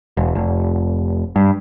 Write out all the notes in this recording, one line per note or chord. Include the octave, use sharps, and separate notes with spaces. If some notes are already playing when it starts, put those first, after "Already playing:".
E1
F1
G2